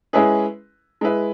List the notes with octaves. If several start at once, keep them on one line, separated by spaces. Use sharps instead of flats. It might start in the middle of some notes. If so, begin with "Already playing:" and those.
G#3 C#4 E4 G#4 B4
G#3 E4 B4